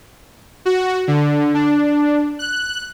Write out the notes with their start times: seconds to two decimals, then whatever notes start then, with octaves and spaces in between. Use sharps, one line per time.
0.65 F#4
1.08 D3
1.54 D4
2.39 F#6